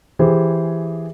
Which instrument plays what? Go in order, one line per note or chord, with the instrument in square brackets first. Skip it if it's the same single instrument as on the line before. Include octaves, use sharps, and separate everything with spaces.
[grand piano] E3 G4 G#4 C5